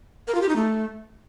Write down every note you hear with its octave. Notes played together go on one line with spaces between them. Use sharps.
A#4
F4
G4
D#4
A3